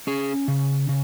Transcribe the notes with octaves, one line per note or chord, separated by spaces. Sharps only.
C#4 G#4
C#3
C#3